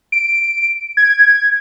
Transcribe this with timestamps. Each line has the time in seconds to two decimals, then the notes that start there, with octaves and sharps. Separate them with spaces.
0.12 D7
0.97 G#6